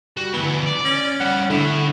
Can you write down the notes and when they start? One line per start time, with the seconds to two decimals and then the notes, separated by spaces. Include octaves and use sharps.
0.17 G3 F#4
0.33 D2 E3 B3
0.66 D5
0.84 C#4
1.20 C#3 G3 F#5
1.50 A2 D3 E4